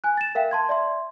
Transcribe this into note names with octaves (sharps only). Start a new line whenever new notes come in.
G#5 F#6
A6 E7
A#4 E5 F5 G5
A5 C6 G#6
D5 E5 C6